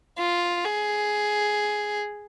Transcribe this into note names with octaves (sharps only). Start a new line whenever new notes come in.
F4
G#4